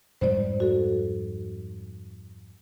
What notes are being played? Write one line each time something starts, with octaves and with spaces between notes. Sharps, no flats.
F2 G#2 G3 C5 D5
F#4 A4